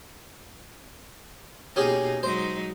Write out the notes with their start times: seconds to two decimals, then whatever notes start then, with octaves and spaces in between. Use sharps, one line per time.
1.76 B2 A#3 C#4 D#4 G4 G#4
2.23 F#3 G#3 D#4 C5